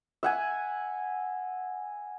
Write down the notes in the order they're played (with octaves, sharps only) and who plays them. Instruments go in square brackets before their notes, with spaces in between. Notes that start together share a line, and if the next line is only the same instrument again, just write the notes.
[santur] E5 F#5 G#5